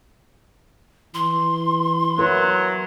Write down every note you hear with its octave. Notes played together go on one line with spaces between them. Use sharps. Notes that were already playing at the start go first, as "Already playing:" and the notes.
E3 C6
F#3 E4 A#4 B4